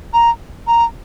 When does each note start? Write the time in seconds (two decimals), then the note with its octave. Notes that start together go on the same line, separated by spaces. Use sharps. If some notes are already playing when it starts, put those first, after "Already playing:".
0.14 A#5
0.67 A#5